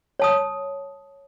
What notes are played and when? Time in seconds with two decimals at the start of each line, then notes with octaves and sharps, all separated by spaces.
0.20 C#5 A5 D#6